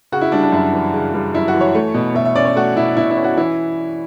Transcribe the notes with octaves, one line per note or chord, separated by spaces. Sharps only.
C#3 F#4
E4
G3 D4
D4
F#2 E4
E3
C#3
G3
F#2 E4
F#4
E3
C#5
A3
B2
B2 E5
E5
C#4 D5
C#5
A3 F#4
B2 E4
B2 E4
E4
C#4
F#4
E3 E4